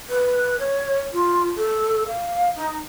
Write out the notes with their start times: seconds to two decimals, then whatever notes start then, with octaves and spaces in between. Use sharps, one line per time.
0.09 B4
0.60 C#5
1.13 F4
1.57 A4
2.08 F5
2.56 D#4